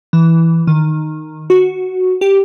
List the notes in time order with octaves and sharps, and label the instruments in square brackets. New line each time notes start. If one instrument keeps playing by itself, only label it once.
[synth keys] E3
D#3
F#4
G4